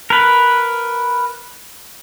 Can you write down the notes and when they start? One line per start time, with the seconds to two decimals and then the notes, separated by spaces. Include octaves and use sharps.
0.10 A#4 B4